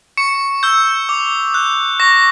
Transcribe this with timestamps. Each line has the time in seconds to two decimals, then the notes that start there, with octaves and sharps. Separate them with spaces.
0.17 C#6 C#7
0.63 E6 G6
1.09 D6
1.54 F#6
2.00 C#6 A#6